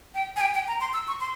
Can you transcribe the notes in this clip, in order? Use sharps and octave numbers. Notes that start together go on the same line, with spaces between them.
G5
G#5
G5
G5
A#5
C6
E6
C#6
C6